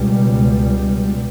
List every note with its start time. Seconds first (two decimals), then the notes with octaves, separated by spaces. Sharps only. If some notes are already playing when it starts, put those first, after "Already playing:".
Already playing: C#2 B2 G3